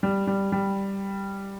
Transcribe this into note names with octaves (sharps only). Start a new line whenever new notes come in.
G3
G3
G3